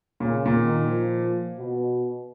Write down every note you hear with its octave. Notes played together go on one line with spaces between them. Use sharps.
A#2 C#3
A#2
D#3
F3
B2